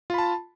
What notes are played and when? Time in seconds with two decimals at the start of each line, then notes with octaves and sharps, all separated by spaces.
0.10 F4
0.14 B5
0.18 A5